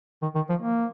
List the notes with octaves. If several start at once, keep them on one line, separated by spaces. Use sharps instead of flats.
D#3
D#3
F3
A#3